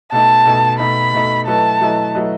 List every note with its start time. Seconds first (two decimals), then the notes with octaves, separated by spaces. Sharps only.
0.12 B2 A3 D#4 A5
0.45 B2 A3 D#4
0.79 B2 A3 D#4 B5
1.14 B2 A3 D#4
1.47 F#3 A3 E4 B4 D#5 A5
1.81 F#3 A3 E4 B4 D#5
2.15 F#3 A3 E4 B4 D#5